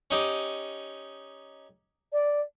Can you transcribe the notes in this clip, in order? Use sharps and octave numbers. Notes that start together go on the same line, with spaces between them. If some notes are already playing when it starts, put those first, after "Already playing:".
C#4 D#4 G4
D5